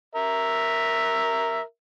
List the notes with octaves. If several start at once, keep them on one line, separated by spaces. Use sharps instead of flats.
A#4 E5